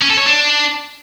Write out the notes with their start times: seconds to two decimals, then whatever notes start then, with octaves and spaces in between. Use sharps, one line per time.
0.01 C#4
0.10 A4
0.18 C#5
0.26 D4